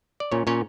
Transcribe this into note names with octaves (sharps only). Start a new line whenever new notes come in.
D5
A#2 C#4 C#5
A#2 C#4 C#5